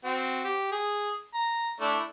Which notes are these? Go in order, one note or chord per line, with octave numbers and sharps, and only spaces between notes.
C4 F#4
G4
G#4
A#5
A3 D4 E4